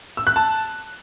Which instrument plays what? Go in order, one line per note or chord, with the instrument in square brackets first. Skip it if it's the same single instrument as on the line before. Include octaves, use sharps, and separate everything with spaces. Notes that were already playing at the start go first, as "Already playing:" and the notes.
[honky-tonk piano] E6
F#6
A5